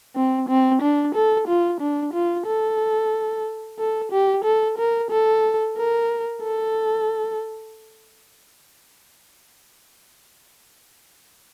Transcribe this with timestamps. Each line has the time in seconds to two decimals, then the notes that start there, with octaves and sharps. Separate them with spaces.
0.16 C4
0.49 C4
0.82 D4
1.15 A4
1.47 F4
1.80 D4
2.14 F4
2.46 A4
3.79 A4
4.12 G4
4.44 A4
4.78 A#4
5.11 A4
5.77 A#4
6.43 A4